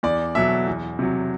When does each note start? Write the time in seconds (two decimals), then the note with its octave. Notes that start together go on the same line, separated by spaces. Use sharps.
0.03 E2 D5
0.35 B2 F#3 E5
0.67 E2
0.99 C3 F#3